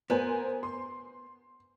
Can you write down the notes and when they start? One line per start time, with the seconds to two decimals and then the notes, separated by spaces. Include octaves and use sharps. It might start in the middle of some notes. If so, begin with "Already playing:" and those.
0.10 B3 A#4 C5 G#5
0.63 C6